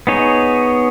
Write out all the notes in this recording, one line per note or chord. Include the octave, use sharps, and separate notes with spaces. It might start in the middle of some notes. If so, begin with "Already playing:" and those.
B3 D#4 G#4 C#5